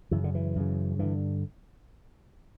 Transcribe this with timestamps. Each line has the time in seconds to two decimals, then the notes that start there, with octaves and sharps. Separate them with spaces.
0.11 F#2 C#3 E3
0.24 D3
0.35 E3
0.56 F#2 C#3
0.99 G2 D3 E3